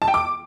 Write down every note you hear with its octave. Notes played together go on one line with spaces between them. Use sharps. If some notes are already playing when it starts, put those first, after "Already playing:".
A5
G5
D6